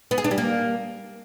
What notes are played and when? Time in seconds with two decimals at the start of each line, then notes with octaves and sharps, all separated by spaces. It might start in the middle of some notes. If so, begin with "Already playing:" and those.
0.11 B3
0.18 G#4
0.24 D4
0.31 G3
0.38 A#3